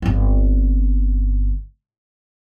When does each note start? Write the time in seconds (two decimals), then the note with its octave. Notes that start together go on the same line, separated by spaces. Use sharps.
0.02 G1 C4